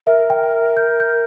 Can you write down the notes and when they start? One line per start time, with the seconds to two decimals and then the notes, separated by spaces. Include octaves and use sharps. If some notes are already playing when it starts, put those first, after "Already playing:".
0.07 A#4 E5
0.30 G5
0.77 G6
1.00 G6